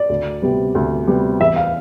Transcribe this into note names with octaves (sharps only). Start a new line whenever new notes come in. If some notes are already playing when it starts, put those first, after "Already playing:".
Already playing: D5
D2
C3 G3 B3
D2
C3 G3 B3
E2 E5
F5